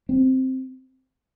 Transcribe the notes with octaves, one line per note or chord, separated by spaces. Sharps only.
C4